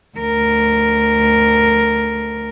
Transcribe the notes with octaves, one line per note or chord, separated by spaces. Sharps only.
D2 A#4